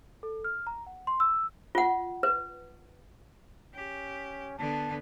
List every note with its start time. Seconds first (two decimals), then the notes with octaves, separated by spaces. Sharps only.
0.23 A4
0.44 F6
0.67 A#5
0.86 F#5
1.07 C6
1.20 E6
1.75 F4 F#5
2.23 B4
3.75 C#4 G4
4.59 D3 B3 A5